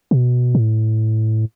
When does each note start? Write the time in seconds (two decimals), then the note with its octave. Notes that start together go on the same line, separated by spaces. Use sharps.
0.11 B2
0.55 A2